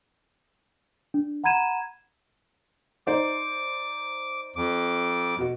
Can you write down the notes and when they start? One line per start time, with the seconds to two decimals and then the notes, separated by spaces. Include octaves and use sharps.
1.14 D4
1.44 F#5 A#5 B5 G#6 D#7 E7
3.07 D#4 C5 D5 D6
4.56 F2 D6
5.39 B2 F#4